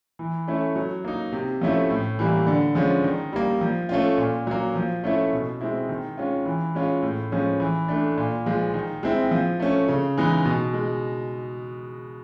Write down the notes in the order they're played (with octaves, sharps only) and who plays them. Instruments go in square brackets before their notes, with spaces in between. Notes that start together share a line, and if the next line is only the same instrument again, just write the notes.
[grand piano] E3
A3 C#4 E4
F#3
A#3 D#4
C3
F3 A3 C#4 E4
A2
E3 G3 A#3
D3
F3 G#3 C#4
D#3
G3 A#3
F3
A3 C#4 F4
A#2
F#3 A#3
F3
A3 C#4 E4
B2
G#3 C4 E4
D#3
G#3 C#4 F4
E3
G#3 C#4 F4
A2
F3 G#3 C#4
E3
A3 D4
A#2
F3 G#3
D#3
G#3 C4 E4
F3
A3 C#4
C#3
E3 G#3 B3 D#4
B2
G#3